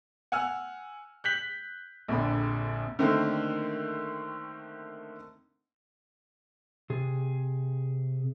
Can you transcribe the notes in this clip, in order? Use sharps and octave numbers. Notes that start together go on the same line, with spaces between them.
F#5 G#5 E6 F6
F#6 G6 B6 F#7
A#1 F2 A#2 D3 D4 B5
D3 D#3 A3 A#3 C4
C3 G#4